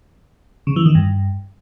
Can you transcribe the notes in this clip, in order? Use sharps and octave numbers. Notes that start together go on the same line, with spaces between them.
C#3
E3
D#3
G2